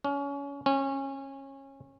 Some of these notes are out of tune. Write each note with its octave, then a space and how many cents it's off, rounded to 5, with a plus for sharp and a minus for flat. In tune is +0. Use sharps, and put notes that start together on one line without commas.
C#4 +25
C#4 -25